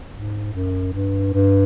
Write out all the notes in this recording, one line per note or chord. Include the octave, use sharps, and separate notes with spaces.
G#2
F#2
G2
G2